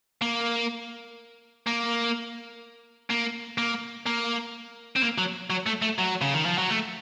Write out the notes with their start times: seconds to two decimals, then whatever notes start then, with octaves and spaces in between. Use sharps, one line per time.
0.22 A#3
1.67 A#3
3.10 A#3
3.58 A#3
4.06 A#3
4.96 C4
5.02 A#3
5.18 F#3
5.50 F#3
5.66 A3
5.82 A3
5.98 F#3
6.21 C#3
6.34 D#3
6.46 F3
6.58 F#3
6.70 A3